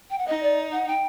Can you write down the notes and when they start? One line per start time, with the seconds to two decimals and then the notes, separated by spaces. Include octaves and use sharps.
0.10 G5
0.18 F#5
0.27 D#4 D#5
0.43 D5
0.72 F#5
0.88 G5